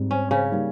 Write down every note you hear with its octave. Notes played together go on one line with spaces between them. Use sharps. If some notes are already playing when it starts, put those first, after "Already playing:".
Already playing: G#2 G3 C4
C#4
C#3 C#4
G3 A#3 D#4